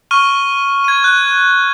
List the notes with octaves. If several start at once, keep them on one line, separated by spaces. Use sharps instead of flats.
C#6 F6 D#7 G7
G#6 D#7
F#6